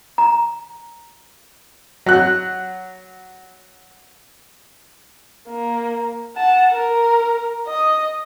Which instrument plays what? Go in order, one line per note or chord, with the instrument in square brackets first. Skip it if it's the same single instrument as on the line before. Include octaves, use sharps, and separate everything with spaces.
[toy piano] A#5
[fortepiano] F#3 F#6
[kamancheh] A#3
F#5 A5
A#4
D#5 D#6